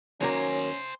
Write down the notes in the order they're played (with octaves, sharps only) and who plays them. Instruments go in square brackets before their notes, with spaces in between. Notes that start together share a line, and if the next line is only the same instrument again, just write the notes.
[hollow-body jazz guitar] D#2 F#3 A#3 [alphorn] C#4 [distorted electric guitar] C5 G#5